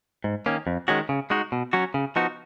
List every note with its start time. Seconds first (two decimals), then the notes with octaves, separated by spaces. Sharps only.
0.24 G#2
0.46 D#3 A#3 C#4
0.67 F2
0.88 D#3 G#3 C#4 F#4
1.09 C#3
1.30 G#3 D#4 F#4
1.52 B2
1.73 F#3 C#4 F#4
1.94 C#3
2.16 F3 B3 D#4 F#4